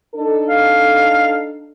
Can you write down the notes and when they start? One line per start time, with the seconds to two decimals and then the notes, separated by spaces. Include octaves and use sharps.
0.16 D4 D#4 A4
0.49 F5